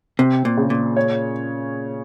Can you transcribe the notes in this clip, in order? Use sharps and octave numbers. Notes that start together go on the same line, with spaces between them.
C3 C4
A#2
C#3
A#2
C#5